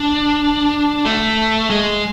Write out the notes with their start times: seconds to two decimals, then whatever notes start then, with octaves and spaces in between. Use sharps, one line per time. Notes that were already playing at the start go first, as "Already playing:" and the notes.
Already playing: D4
1.05 A3
1.70 G#3